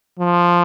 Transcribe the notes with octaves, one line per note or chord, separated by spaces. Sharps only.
F3